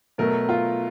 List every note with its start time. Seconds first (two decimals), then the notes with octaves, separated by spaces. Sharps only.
0.18 B2 F#3 A3 A#4
0.49 F4